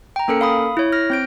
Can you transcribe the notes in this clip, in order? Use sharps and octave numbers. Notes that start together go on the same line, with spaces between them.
G5 A#5
A#3 C#4 A4 A#4 C#7
F5 B5 D#6
E4 C#5
F6 A#6
C4 G6 D7